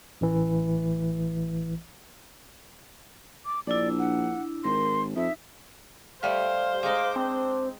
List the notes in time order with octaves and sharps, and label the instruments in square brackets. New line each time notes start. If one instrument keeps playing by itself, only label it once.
[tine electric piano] A1 E3
[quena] D6
[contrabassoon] A#1 [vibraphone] D4 E4 [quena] D5
[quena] F#5
[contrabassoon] G#1 [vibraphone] A#4 [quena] C6
[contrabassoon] F2 [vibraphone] D#4 [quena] E5
[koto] G3 A3 G4 [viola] C5 [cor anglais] F5
[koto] G#3 D#4 [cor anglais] F5 [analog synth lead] D6
[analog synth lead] C4 [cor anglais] D4